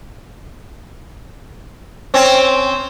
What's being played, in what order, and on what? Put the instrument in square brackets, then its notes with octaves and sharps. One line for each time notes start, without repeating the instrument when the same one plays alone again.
[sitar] C4 C#4